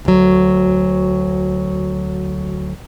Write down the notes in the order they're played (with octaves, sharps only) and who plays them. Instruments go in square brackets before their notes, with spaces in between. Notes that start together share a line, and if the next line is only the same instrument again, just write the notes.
[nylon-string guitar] D2 F#3